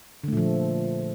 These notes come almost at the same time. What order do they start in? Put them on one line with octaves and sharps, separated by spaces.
D3 A3 A#2 F3